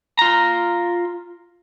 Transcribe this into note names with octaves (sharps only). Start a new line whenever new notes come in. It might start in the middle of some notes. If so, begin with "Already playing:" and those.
F4 A#5